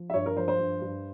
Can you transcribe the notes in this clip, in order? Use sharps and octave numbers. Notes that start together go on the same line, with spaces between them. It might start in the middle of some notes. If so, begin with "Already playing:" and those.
Already playing: F3
E5
G2 C#5
A#4
F3 C5
C5
G2
G2